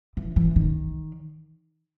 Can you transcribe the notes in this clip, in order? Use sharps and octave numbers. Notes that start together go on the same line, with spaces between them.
E3
E3
D#3